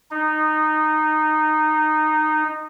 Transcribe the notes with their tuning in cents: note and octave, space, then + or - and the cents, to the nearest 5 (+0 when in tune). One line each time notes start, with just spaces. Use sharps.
D#4 -15